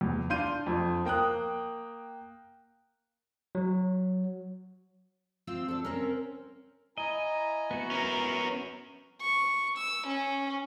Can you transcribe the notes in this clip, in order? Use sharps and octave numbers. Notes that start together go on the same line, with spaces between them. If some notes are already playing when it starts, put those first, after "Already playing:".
E2
D4 F5 C6 G6 D#7
F2
A#3 G5 D#6 F#6
F#3
C4 F4 C5 E6
D4 A4
C4 C#4 A#4
E4 D#5 G#5 A#5
B3 F#4
C#4 A#4
C#6
E6
C#4